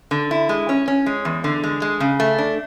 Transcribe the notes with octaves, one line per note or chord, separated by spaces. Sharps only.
D3
E4
G#3
C#4
C#4
G#3
E2
D3
G#3
G#3
C#3
A3
D4